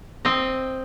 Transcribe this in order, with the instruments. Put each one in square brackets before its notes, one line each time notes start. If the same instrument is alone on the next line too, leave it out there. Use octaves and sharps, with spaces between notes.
[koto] C4 D#5